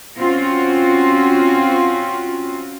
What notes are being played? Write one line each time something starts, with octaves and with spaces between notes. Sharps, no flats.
C4 C#4 F4 F#4